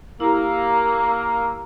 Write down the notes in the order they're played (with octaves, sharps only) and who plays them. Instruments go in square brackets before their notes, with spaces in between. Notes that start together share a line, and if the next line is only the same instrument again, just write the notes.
[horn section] A#3 [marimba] E4 G4 [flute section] A#5 E6